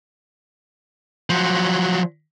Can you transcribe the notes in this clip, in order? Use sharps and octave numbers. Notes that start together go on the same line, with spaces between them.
F3 F#3